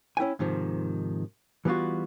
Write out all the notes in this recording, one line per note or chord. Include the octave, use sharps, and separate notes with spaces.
C#4 E4 G5 G#5
G#2 C3 D#3 F3
E3 G3 B3 F4 F#4